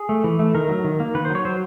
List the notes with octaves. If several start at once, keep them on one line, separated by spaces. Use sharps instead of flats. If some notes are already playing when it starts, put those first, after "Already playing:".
Already playing: G#4
A3
E3
A3
D#3 A#4
F#3
D#3
A#3
D#3 B4
C5
F#3
C#5
F#3 C5